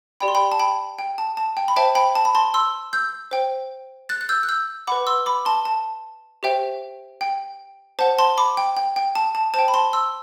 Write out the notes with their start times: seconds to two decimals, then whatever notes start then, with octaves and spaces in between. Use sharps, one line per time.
0.20 G4 D5 G5 B5
0.28 C6
0.35 G5 B5
0.52 A5
0.59 G5 B5
0.99 G5
1.18 A5
1.37 A5
1.57 G5
1.68 B5
1.76 C5 E5 G5 A5
1.95 G5 B5
2.15 A5
2.25 B5
2.35 A5 C6
2.54 C6 E6
2.93 E6 G6
3.31 C5 G5
4.09 F#6 A6
4.21 F#6
4.29 E6 G6
4.43 F#6
4.49 E6 G6
4.87 B4 F#5 B5 D6
5.07 C6 E6
5.26 B5 D6
5.45 A5 C6
5.65 A5
6.43 G4 C5 E5 G5
7.21 G5
7.99 C5 F#5 A5
8.18 A5 C6
8.38 B5 D6
8.57 G5
8.77 G5
8.96 G5
9.15 A5
9.35 A5
9.54 C5 G5 A5
9.68 B5
9.74 A5 C6
9.93 C6 E6